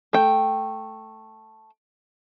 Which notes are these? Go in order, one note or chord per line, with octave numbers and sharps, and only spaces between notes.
A3 G5